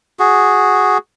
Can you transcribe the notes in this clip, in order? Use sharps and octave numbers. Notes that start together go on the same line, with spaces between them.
F#4 G#4